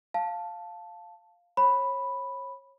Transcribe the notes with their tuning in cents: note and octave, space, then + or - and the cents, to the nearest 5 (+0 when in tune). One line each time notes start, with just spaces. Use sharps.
F5 +0 A5 +0
C#5 -30 B5 +0